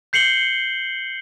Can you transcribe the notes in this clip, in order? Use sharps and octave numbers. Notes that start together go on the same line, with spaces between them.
G6 C7 C#7 F#7 G7